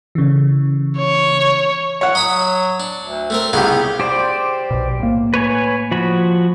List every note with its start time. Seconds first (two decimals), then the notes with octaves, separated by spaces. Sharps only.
0.15 C#3 E3
0.99 C#5
2.01 C#5 F#5
2.15 F#3 D#5 B5 D#6
2.80 D4
3.03 D2
3.30 A3 C4 A#4
3.53 C2 C#3 B3 F4 G4 F5
4.00 G4 C5 D5
4.71 B1 B2
4.99 A2 A#3
5.34 B4 C#5 G#5
5.92 F3 F#4 B5